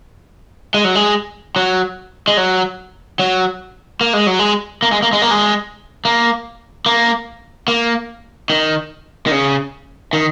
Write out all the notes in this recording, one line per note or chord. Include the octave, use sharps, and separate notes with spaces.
G#3
F#3
G#3
F#3
G#3
F#3
F#3
A#3
G#3
F#3
G#3
A#3
G#3
A#3
G#3
A#3
G#3
A#3
A#3
A#3
D#3
D#3
C#3
D#3